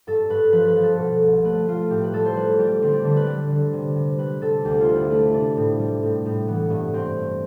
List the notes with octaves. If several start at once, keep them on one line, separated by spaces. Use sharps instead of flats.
G2 A4
G2 B4
F3 B4
B4
F3
A4
B2
C2
A3 B4
A3 F4
A2 G4
B4
G3 A4
C5
G3 B4
G3 G4
D3 C4
D4
D3 D4
B4
G3
D3
C3
C3
G3 B4
C3 A4
D2 G4
F4
C3
E4
A3 E4
C3 D4
A2
G3
A2
A2
E3 B3
G2 B3
G2 C4
G2